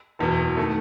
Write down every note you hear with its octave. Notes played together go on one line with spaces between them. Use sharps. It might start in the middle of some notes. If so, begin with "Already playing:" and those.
F#1 E2 B2
D#3 A3